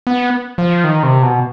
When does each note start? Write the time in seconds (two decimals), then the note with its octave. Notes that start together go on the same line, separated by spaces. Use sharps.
0.07 B3
0.58 F3
0.84 D#3
1.03 C3
1.22 B2